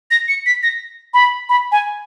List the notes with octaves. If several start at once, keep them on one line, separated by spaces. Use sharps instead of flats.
A#6
C#7
B6
A#6
B5
B5
G#5